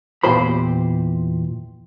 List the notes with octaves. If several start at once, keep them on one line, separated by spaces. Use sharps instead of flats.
E2 A#2 G4 C5 B5